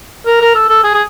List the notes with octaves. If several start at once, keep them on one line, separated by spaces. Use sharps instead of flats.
A#4
A#4
A4
A4
G#4
G#4